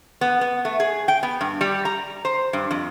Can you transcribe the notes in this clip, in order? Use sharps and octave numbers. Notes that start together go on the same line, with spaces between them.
B3
B3
A3
G#4
G5
B3
G2
G3
A#5
C5
G2
F2